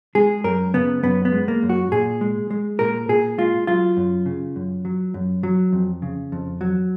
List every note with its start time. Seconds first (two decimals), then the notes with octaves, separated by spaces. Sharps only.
0.15 G#3 G#4
0.44 F#2 A#4
0.74 C#3 B3
1.03 F#2 B3
1.25 B3
1.32 G#3
1.48 A#3
1.63 F#2
1.69 F#4
1.92 A#2 G#4
2.21 G#3
2.50 G#3
2.79 A#2 A#4
3.09 A#2 G#4
3.38 G#3 F4
3.67 F#3 F4
3.97 F#2
4.26 C#3
4.56 F#2
4.85 F#3
5.14 F#2
5.43 F#3
5.73 F2
6.02 C#3
6.32 F2
6.61 F#3